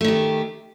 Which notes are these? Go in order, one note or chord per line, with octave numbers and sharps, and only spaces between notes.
D#3 A3 G4